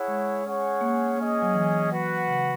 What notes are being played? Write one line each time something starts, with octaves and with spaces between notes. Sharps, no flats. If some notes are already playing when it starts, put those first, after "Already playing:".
Already playing: E4 G#4 C#5 F#5
G#3
C#4 G#4 C#5 F#5
A#3
A#3 C#4 G#4 D#5
F#3
E3
F#4 B4 F#5
C#3